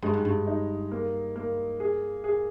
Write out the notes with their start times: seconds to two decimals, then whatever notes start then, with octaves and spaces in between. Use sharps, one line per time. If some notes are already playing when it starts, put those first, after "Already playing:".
0.02 G2 G#3
0.14 G#2
0.25 G2
0.47 D#4
0.92 A#3
1.36 A#3
1.80 G#4
2.24 G#4